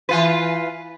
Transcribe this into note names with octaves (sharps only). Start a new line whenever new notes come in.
E3 F4 B4